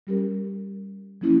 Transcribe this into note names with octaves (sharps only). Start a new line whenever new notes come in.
G3 C#4 G4 A#4
F3 A#3 C#4 E4